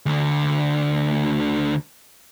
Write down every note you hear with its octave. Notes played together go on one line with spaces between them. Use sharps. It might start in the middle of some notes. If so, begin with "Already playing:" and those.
D2 D3